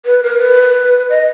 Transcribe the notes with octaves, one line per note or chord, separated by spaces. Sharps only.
B4
A#4
B4
D#5